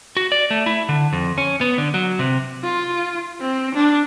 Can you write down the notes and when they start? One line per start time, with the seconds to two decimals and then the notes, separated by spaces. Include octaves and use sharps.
0.17 F#4
0.32 D5
0.51 A3
0.66 E4
0.89 D3
1.13 F2
1.38 C#4
1.61 B3
1.78 D3
1.94 F#3
2.19 C3
2.64 F4
3.41 C4
3.75 D4